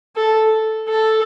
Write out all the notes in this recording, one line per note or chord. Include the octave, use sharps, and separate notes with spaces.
A4
A4